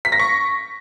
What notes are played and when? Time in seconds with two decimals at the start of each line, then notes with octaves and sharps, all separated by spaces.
0.05 B6
0.12 A#6
0.20 C#6